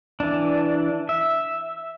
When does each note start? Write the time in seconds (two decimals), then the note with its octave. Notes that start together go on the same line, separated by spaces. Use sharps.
0.20 E3 D4
1.09 E5